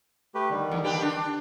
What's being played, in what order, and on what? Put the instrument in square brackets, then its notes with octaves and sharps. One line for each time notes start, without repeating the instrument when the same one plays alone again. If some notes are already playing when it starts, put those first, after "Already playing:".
[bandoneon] A3 G4 B4
D3 D#3 G3
[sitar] E2
D4 G4 B4
D4